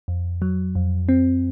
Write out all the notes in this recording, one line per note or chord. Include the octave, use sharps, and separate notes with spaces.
F2
F#3
F2
C4